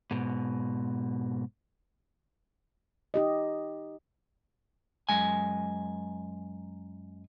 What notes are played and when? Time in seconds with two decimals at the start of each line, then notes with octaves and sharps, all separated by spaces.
0.11 G#2 B2
3.14 D#4 G4 D#5
5.09 F#2 G#3 G#5